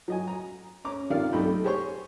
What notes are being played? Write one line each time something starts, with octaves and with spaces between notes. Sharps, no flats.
F#3 D#5 G#5
A#5
C#4 A#5 D6
C3 D#3 F4 D5 F5
B1 C3 A3 D#4 G5 B5
G4 G#4 C5 C#5 C#6